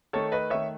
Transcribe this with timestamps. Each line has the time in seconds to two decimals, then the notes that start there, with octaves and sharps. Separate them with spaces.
0.13 D#3 A3 A4 C#5
0.32 B4 D#5
0.50 D#3 A3 C#5 E5